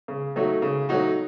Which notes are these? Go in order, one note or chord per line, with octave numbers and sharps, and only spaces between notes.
C#3
F#3 A3 D#4 F#4
C#3
F#3 A3 D#4 F#4